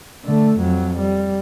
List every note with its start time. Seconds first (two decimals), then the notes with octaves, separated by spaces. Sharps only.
0.25 D3 A3
0.59 F2 F#3
0.99 G3